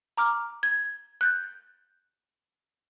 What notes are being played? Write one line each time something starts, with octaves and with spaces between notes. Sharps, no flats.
A#5 D6 F6
G#6
F#6 G6 A6